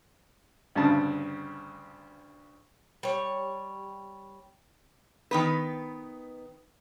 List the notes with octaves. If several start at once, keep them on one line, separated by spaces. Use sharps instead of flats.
D2 G2 C#3 A5
G3 C#5
D#3 B3 B4